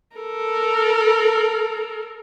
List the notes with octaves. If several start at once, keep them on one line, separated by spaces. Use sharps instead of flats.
A4 A#4